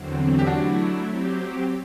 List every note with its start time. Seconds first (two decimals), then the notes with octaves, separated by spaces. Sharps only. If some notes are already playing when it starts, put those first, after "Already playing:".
Already playing: E2 D3 F#3 C4
0.39 G4
0.47 F#3 A3 D4 E4 F#4
1.05 F#3 C4 G4